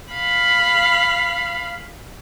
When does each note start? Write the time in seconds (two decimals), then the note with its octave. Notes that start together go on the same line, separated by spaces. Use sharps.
0.12 F5 B5